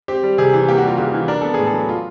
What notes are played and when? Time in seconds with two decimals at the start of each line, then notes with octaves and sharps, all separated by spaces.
0.08 C4 G4
0.23 G3
0.38 C3 G#4
0.53 E3
0.68 A#3 G4
0.78 F#4
0.83 G3 F4
0.97 C#3 F#4
1.14 E3
1.28 D4 A#4
1.41 B3 A4
1.54 A2 G#4
1.66 A4
1.73 F#3
1.89 F4